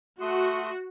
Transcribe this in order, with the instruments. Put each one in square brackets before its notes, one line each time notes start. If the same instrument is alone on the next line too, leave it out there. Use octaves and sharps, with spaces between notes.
[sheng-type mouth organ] A3 C6 D#6 [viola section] F#4